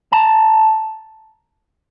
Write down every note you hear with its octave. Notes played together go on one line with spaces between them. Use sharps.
A5 A#5